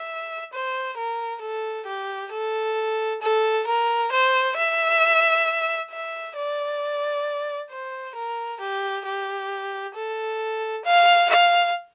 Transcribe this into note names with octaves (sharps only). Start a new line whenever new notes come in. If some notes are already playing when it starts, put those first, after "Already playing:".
Already playing: E5
C5
A#4
A4
G4
A4
A4
A#4
C5
E5
E5
D5
C5
A#4
G4
G4
A4
F5
F5